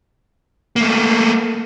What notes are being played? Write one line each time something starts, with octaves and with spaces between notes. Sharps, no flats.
A3 A#3